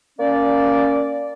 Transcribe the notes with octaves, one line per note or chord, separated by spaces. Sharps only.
A#3 C#4 D5